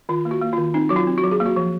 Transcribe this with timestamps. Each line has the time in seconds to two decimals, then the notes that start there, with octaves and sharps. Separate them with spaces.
0.09 D#3 F4
0.25 A#3
0.31 F#4
0.41 A#3
0.53 F4
0.58 D#3
0.74 C4 D#4
0.89 F#3 F#4
0.96 F4
1.07 C4
1.18 F#4
1.23 F#3
1.31 G#4
1.40 A#3
1.46 F#4
1.56 F3